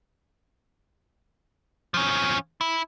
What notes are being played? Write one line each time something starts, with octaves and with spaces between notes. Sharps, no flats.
F3 C#4
E4